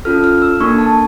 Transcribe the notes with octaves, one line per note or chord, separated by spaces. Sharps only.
C#4 F4 A4 F6
F6
E6
A#3 D4 A4 C#6
A5